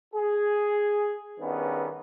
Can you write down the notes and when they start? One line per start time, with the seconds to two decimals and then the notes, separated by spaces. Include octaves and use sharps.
0.14 G#4
1.40 G2 D#3 B3 C#4 G#4